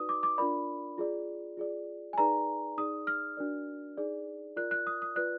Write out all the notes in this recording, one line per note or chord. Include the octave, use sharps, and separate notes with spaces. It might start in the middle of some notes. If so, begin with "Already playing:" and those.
Already playing: D#4 F#4 B4 D5 D#6
D6
D6
D4 F4 A#4 D5 B5
F4 G#4 D5
F4 G#4 D5
G#5
D#4 G#4 B4 D5 A#5
D#4 G#4 D5 D#6
F6
D4 F#4 A#4 D5
D#4 G#4 D5
F4 A#4 D5 F#6
F#6
D#6
D#6
F4 B4 D5 F#6